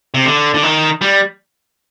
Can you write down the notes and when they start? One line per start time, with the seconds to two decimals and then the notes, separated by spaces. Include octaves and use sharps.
0.14 C3
0.25 D3
0.54 D3
0.63 D#3
1.01 G3